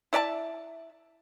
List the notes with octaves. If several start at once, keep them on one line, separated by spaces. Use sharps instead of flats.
E4 D5 E5 A5